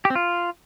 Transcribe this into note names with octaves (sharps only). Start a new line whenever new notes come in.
G4
C4
F4